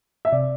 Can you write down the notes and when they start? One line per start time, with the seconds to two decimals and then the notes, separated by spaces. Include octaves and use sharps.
0.25 E5
0.32 C3 D5